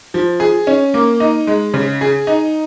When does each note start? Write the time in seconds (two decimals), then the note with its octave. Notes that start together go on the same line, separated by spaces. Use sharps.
0.14 F3
0.40 G#4
0.67 C#4
0.94 A#3
1.20 D#4
1.47 G#3
1.74 C#3
2.01 G#4
2.27 D#4